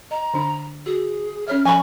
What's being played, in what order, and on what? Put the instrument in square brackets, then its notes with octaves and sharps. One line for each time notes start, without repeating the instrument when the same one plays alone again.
[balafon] D#5 [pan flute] A#5
[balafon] D3 D4 B5
[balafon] F#4 [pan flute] G#4
[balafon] C#4 C#5 E5 [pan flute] F6
[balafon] F3 [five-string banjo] G#5 B5 [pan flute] C#6